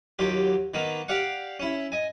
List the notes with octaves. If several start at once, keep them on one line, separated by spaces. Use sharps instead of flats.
D#2 F#3 F4 G4
D#3 A#3 B3
G4 D5 F5 F#5
C#4 E4
D#5 G#5